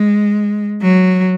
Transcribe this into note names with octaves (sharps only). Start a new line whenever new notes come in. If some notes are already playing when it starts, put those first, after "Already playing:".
Already playing: G#3
F#3